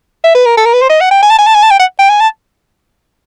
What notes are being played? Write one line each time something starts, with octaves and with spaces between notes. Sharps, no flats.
E5
B4
A#4
A4
A#4
B4
C5
D#5
F#5
G5
G#5
A5
G#5
A5
G#5
A5
G5
F#5
G5
G#5
A5